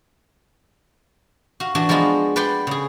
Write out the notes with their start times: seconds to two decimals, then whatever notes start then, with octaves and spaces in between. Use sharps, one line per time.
1.60 F#4 F5
1.75 E3 D4 F#4
1.89 F3 G#3 B3 F4 F#4
2.36 B4 D5 F#5 G5 C6
2.67 C#3 G#4